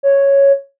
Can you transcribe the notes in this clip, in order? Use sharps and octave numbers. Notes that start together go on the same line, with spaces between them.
C#5